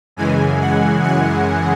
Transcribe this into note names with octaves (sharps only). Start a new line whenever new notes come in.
F#2 C#3 E3 G#3 G#5
F#5
F#5